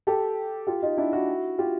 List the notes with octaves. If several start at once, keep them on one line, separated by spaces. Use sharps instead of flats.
G4 A4
F4 G4
D#4 F4
D4 E4
E4 F#4
F4 G4